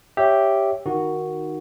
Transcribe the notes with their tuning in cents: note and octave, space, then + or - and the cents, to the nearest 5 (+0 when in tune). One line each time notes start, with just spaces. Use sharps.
G4 +0 C#5 +0 E5 +0
D#3 +0 D#4 +5 F#4 +0